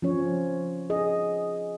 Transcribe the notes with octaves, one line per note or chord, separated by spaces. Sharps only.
F3 C#4 C#5
G#4 D#5